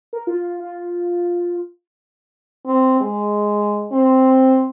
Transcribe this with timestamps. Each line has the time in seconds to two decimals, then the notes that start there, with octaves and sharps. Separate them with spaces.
0.13 A#4
0.27 F4
0.60 F4
2.66 C4
3.01 G#3
3.92 C4